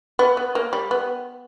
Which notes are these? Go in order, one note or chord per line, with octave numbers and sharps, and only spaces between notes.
B3
B3
A#3
G3
B3